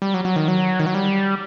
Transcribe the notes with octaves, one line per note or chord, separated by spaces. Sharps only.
G3
F#3
F#3
D#3
F#3
D#3
F#3
G3